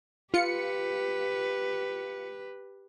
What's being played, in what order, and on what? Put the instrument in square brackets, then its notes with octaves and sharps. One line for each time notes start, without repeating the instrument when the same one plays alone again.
[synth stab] F4 C#7 [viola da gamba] G4 B4